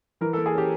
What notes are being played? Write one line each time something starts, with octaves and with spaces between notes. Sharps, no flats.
E3 A#4
A4
A#3
G#4
C#4 G4